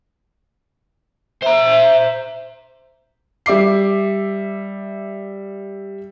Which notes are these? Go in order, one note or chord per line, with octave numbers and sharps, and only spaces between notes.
C5 E5 A#5
G3 E5 D6 C7